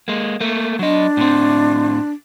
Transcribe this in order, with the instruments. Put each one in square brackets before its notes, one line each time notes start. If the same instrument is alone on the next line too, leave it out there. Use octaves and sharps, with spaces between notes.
[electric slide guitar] G#3 A#3
A3 A#3
[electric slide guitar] F#3 D#5 [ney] D4
[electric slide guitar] A2 C4